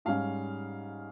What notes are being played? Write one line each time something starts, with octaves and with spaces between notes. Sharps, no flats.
G#2 G3 C#4 F5